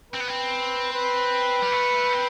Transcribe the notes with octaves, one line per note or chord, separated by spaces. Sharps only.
C4 B4
B3
C4
B4
G3
A3
C4